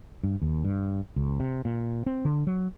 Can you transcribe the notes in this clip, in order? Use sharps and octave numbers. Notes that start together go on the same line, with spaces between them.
G2
D#2
G2
C#2
C3
A#2
C4
D3
F#3